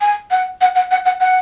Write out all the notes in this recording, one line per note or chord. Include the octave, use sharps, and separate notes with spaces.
G#5
F#5
F#5
F#5
F#5
F#5
F#5